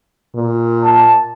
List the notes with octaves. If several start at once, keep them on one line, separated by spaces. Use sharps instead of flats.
A#2
A5